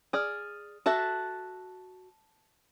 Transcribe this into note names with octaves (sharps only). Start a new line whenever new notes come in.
G#4 D5 D#6 F6
F#4 A4 E5 A5 F#6